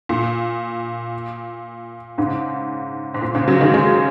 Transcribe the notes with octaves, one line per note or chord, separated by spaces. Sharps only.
A#2
G#2 C#3
G#2
A#2
G#2 C#3
C#3 F#3
D#3 G#3
G#3 C#4